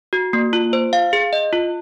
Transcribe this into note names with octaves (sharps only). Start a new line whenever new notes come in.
F#4
A#3
F4
C5
F5
G#4
D#5
F4